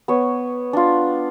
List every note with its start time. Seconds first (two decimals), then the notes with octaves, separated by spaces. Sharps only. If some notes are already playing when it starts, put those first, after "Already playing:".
0.08 B3 C#5
0.73 D4 F4